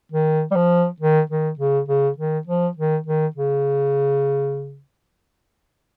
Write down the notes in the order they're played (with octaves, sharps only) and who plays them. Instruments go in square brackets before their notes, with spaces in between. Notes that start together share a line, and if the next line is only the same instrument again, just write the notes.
[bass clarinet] D#3
G3
F3
D#3
D#3
C#3
C#3
D#3
F3
D#3
D#3
C#3